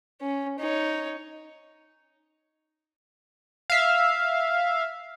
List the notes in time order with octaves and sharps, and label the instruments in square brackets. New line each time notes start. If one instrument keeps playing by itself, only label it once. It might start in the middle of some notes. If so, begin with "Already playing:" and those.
[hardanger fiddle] C#4
D#4 C#5
[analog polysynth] E5 F5